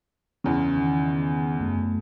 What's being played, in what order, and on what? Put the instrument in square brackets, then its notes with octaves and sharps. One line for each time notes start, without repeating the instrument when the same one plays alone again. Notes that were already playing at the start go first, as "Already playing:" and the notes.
[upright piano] E2 C#3
[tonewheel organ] D#3
F#2 A3